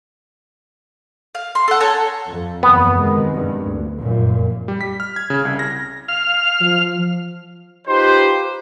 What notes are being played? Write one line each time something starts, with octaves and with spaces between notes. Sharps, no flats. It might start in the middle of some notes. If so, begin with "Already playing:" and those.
F5
C6
A4 F#5
A4 C#5 G#5 A#5
F2
F#1 E2 B3
C3 D#3 G#3
G2
D2
F1 F#2 A#2
G3
B6
F6
G#6
C#3
C2
A#6
F5 F6
F3
D#4 F4 G4 B4 C5